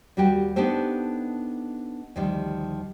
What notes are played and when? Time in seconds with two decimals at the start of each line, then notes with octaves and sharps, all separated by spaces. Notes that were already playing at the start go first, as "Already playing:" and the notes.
0.17 D#2 G3 F#4 G4 G5
0.56 B3 D4 D#4 G4 A4 C5
2.16 D2 D#3 F3 G3